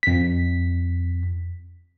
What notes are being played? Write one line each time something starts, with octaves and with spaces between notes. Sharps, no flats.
F2 B6